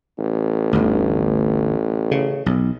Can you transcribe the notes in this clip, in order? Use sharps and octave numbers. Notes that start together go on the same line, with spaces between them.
A1
G1 D2
C#3
B1